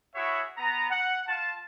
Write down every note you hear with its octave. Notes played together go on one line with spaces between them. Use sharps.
E4 F#4 G#4 C#5 E5
B3 A#5
F#5
F4 A5